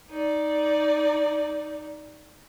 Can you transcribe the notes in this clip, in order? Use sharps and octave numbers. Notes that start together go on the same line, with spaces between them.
D#4 D5